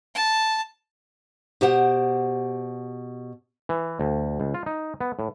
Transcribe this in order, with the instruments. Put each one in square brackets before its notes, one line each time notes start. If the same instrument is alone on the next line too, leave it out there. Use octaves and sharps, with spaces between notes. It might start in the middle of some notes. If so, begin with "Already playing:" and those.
[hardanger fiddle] A5
[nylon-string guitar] B2 G4 C5 F#5
[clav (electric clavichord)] E3
D2
C#2
F4
D#4
B3
A2